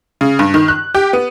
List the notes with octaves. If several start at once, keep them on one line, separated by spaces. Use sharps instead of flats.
C#3
G2
D#3
F#6
G4
B3